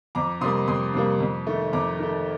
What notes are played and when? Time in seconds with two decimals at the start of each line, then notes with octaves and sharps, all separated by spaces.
0.15 F2 A#5 D6
0.41 C3 G3 A#3 C6 D#6
0.68 F2 C6 D#6
0.94 C3 G3 A#3
1.20 F2
1.47 D#3 A3
1.73 F2 A#5 D6
1.99 D#3 A3